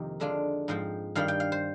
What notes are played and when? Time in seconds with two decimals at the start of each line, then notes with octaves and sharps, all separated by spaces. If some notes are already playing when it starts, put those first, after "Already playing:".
Already playing: F2 C3 D#3 A#3
0.20 D3 G#3 D4 F4
0.68 G#2 F3 C4
1.15 G2 D#3 G3 F5
1.28 G5
1.40 F5
1.52 C5